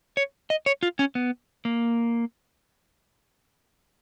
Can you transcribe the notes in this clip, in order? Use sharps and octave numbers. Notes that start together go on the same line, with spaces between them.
C#5
D#5
C#5
F4
C#4
B3
A#3